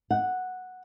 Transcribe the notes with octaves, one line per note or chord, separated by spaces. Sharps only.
F#5